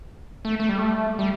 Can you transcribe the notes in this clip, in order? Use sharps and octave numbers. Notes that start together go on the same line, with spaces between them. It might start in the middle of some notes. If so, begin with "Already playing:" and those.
A3
A3
G3
A3
G3